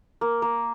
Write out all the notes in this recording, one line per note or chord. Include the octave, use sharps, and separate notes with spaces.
A#3
A#3